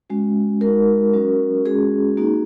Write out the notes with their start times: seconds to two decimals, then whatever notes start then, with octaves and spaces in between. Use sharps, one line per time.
0.10 G#3 C#4 F#4
0.61 G#3 D#4 F#4 A#4
1.13 F#3 C#4 F#4
1.65 G#3 C#4 F#4 G#4
2.17 A#3 D#4 F#4